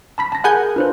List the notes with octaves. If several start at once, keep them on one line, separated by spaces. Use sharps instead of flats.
A5 B5 B6
A5 A#6
G#4 A#4 F#5 G#5 B5 G6
D4 D#4 F4 B4 C5